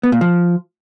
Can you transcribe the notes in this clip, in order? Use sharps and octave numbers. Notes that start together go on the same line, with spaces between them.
B3
A#2
F3